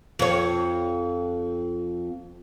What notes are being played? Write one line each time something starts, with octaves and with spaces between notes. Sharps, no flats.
F2 C#5